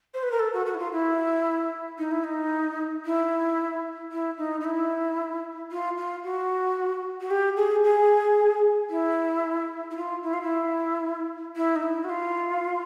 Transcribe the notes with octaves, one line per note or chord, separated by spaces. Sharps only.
C5
B4
A#4
A4
F#4
F#4
E4
F4
E4
D#4
E4
D#4
E4
E4
D#4
D#4
E4
F4
F4
F#4
F#4
G4
G#4
G#4
E4
E4
F4
E4
F4
E4
E4
D#4
E4
F#4
F4